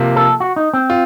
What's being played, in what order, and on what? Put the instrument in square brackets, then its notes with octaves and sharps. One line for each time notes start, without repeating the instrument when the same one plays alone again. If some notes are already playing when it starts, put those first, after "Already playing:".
Already playing: [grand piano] C3 F3 A#3
[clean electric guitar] A4
F#4
D#4
C4
[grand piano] F4